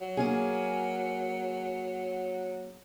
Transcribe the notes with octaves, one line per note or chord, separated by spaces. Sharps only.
F#3
A#3 C#4 G#4